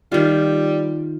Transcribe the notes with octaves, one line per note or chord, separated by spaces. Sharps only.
D#3 G3 F4